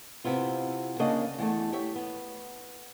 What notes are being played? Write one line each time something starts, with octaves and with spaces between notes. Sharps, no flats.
C3 B3 E4 F4
C#3 A#3 D4 D#5 F#5
E2 A2 A3
G4 C#5 E5
B3